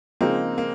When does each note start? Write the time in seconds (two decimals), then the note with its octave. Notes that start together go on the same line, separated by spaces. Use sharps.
0.21 C#3 F3 G#3 A#3 C4 D#4
0.58 A#3